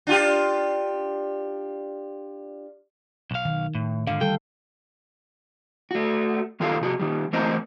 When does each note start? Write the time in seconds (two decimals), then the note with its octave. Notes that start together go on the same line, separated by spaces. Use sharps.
0.07 D4 F4 G4
3.31 B1 F5
3.45 D#3
3.75 A2
4.07 G#2 D3 F5
4.21 D2 D#3 G3 A4 G5
5.91 A3 F#4
6.60 G2 D#3 F4 A4 A#4 F5
6.81 C3 F#4 G#4
7.00 D#3 G3
7.33 E3 A3 C4 A#4 C5 D#5